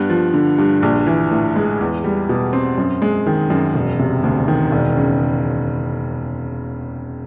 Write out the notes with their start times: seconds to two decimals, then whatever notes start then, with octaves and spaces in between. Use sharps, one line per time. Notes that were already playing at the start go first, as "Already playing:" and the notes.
Already playing: G2 B3
0.10 F3
0.34 D3
0.58 G2
0.83 A#1
1.07 E3
1.31 A2
1.56 G#3
1.81 E2
2.04 G3
2.29 B2
2.53 C4
2.78 F#2
3.02 G#3
3.26 D#3
3.50 F#2
3.75 E1
3.99 C3
4.24 D2
4.48 D#3
4.72 E1
4.97 C#3